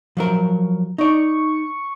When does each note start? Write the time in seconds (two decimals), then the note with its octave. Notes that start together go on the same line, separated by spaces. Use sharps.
0.17 F3 F#3 A#4
0.98 D#4 D5 C#6